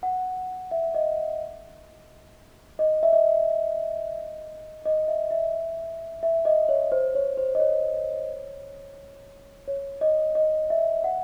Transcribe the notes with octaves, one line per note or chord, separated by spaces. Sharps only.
F#5
E5
D#5
D#5
E5
D#5
D#5
E5
E5
E5
D#5
C#5
C5
C#5
C5
D#5
C#5
C#5
D#5
D#5
E5
F#5